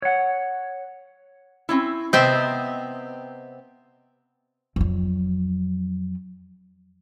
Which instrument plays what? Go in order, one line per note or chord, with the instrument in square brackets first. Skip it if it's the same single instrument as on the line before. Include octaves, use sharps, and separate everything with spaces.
[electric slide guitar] C#5 F#5
[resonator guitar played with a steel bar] C4 C#4 E4
[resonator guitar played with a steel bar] C3 B3 D#5 [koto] C4 C5 E5
[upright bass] F2 F#3